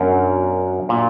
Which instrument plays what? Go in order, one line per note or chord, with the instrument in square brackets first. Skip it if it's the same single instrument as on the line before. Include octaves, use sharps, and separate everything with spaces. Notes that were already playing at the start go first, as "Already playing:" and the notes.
Already playing: [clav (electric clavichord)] F#2 [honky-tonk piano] B2 D4 F#4 A#4
[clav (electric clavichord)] A#2